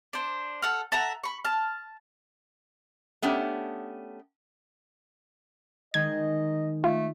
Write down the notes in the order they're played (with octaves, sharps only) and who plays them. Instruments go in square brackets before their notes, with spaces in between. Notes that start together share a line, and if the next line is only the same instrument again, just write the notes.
[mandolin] D4 C5
A4 F#5 F6
A4 E5 F#5 A#5
B5 C#6
A5 F6
[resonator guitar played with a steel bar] A3 B3 C#4 D4 G4
[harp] D#3 G#3 D#4 [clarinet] D#5 [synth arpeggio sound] G#6
[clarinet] A3 [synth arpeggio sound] F4